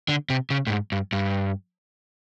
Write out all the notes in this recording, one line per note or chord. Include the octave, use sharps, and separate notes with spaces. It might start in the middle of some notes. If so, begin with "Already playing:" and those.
D3
C3
C#3
A2
G#2
G2
G2